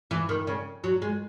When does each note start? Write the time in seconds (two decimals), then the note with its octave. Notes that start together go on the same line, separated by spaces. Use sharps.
0.11 E3
0.29 D#3
0.47 C#3
0.84 F#3
1.02 G#3